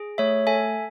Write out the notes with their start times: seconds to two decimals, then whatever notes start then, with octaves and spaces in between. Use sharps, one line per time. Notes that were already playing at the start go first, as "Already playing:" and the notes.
Already playing: G#4
0.18 A3 C#5 E5
0.47 A4 E5 G#5